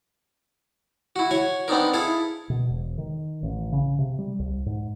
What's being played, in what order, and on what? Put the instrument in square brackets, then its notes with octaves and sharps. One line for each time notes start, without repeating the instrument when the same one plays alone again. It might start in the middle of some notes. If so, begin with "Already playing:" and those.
[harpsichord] E4 F#4
F#4 C#5 G#5
B3 C4 D4 D#4 A#4
E4 G#4 A4 F5
[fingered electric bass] B2
E1
D#3
A1
C#3
C3
G3
C2
G#2